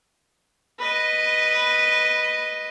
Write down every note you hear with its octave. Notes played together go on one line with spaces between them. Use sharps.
B4 D#5